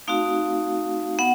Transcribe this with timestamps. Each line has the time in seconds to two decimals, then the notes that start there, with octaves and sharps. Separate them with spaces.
0.08 A3 C4 D#4 F#4 F5
1.19 B3 F#5